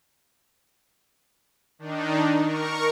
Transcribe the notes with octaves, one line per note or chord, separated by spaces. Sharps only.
D#3 D4 D#4
A#4 C#6